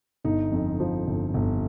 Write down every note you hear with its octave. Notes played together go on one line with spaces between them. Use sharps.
G1 D#4
F2
F3
G1
G1